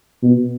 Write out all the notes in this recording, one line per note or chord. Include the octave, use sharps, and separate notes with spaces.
B2